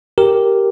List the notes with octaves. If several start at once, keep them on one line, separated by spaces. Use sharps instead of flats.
G4 A#4